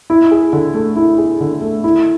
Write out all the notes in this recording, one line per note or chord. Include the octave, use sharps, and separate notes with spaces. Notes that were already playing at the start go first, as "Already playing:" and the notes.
E4
G#4
D3
A3
E4
G#4
D3
A3
E4